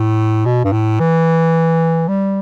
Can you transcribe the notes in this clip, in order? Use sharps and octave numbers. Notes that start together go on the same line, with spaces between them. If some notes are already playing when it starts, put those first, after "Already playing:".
Already playing: A2
B2
G2
A2
E3
G3